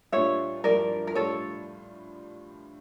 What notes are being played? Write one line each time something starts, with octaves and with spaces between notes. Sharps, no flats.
A#2 G3 D4 F4 C#5 E5
G2 F3 A#3 E4 G4 A#4 D5
A#4
A2 G3 D4 F4 A4 C#5